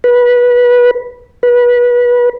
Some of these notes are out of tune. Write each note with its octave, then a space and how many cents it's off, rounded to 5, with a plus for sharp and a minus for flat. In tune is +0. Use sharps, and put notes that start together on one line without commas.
B4 -20
B4 -25